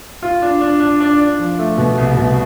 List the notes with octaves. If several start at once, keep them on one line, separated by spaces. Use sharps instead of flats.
F4
D4
D4
D4
D4
D4
F3
A3
B2
C2
B2